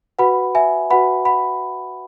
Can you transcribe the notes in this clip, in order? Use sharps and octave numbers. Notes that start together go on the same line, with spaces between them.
F#4 B4 F#5 B5
E5 G#5
F#4 B4 F#5 B5
F#5 B5